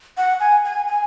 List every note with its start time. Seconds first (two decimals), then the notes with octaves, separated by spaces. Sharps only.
0.17 F#5
0.40 G#5
0.65 G#5
0.88 G#5